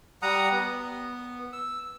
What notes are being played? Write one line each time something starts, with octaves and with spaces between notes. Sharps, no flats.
G3 F#5 A#5 D#6
B3
E6